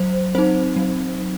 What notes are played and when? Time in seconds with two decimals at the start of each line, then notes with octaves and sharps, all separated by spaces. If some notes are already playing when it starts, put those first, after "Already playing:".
Already playing: F#3 C5
0.35 C4 D#4 C5
0.76 F#3